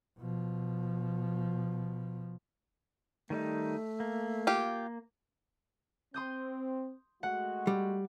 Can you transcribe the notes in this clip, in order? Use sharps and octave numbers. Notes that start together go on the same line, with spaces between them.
B2 F3
D#3 G3 A3 D#4
A#3
F4 G4
C4 C6 D#6 G6
G#3 A3 F#4 F#5
G3